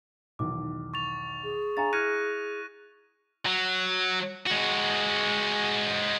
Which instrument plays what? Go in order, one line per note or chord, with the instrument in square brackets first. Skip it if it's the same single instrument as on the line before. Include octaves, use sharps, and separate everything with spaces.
[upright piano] B1 E2 D#3 [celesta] D6
[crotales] C#6 A6 F7
[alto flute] G#4
[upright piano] D4 F5 [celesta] G#5 A#5 A6
[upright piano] E4 [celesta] F6 G#6 C#7 [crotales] F#6 A#6 D#7
[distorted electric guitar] F#3
G#3 F#4